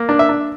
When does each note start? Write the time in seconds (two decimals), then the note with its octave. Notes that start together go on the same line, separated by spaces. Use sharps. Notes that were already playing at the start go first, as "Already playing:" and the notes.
Already playing: A#3
0.09 D4
0.19 E5
0.29 D4